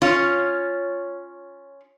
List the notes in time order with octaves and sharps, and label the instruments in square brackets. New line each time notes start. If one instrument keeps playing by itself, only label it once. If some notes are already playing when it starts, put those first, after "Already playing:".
[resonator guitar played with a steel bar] C#4 F4 C#5